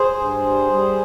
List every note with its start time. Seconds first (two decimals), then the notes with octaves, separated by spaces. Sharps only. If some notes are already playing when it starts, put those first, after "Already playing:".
Already playing: G#4 C5
0.19 G2
0.46 G3
0.72 G3